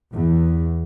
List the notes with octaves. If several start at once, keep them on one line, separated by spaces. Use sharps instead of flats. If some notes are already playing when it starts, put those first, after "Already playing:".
E2